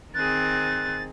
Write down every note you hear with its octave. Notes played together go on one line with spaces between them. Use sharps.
D#3 C4 G#4 F#6 A6